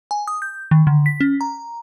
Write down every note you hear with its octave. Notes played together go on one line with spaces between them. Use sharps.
G#5
D#6
G6
D#3
D3
B6
C#4
A#5